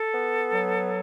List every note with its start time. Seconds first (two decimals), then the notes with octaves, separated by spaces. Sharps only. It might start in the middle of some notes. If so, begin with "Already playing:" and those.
Already playing: A4
0.13 B3
0.52 F#3